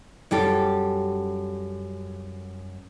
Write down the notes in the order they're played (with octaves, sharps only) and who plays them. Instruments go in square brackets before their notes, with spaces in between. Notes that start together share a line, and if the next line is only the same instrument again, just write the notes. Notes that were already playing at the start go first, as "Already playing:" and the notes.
[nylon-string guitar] F#2 G3 G4 A4